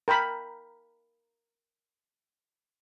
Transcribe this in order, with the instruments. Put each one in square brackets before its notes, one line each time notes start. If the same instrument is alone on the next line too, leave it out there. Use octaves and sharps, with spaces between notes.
[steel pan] A#4 G5 A#5 B5